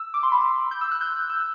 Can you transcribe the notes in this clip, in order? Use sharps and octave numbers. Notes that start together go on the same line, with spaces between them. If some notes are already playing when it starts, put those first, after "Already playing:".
Already playing: E6
D6
C6
B5
C6
G6
E6
F#6
G6
E6